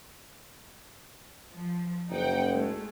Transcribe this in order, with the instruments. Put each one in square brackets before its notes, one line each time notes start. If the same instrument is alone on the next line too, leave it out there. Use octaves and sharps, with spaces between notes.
[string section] F3
[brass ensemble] F#1 [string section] D#4 F#5 G5
[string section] G#3 A3